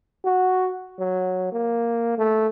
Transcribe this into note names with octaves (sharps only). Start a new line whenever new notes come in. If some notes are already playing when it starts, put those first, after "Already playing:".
F#4
F#3
A#3
A3